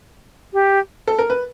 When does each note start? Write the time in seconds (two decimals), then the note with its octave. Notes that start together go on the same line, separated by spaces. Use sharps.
0.53 G4
1.08 A4
1.19 A#4
1.30 B4